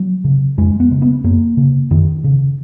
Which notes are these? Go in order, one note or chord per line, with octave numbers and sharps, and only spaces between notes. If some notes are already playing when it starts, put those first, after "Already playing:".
Already playing: F#3
C#3
F2 G#3
B3
C#3
B3
F#2 A#3
C#3
F#2 D#3
C#3